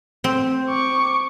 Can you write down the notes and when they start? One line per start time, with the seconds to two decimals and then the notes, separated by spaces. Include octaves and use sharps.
0.24 C4
0.70 C#6 D6